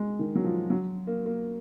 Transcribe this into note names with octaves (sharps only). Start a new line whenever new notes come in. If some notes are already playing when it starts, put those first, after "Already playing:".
Already playing: G#3
D#3
F#3
F3
F#3
A#3
A#3